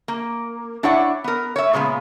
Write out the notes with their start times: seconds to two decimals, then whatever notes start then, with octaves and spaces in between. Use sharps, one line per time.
0.08 A#3
0.83 D4 E4 C#5 D5 F#5
1.24 B3 A#4
1.56 C#5 E5
1.73 A#2 C#3 G#3 B3